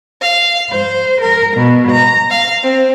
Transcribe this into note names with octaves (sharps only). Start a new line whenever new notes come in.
F5
C5
A#4
B2
A#5
F5
C4